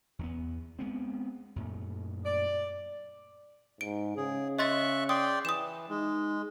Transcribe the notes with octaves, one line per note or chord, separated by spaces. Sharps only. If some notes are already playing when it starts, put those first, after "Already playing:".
E2 A#3 B3
G#3 B3 C4
F#2 A#2 A3
D5
G#2 D7
C#3 G#4
D#5 E5 C6 C#6 F#6 A6
D5 G5 C6 D#6
E3 D#6 E7
G#3 D#4